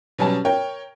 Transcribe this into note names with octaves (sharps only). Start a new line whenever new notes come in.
B2 F#3 G3 C#4 A5
A#4 C#5 G5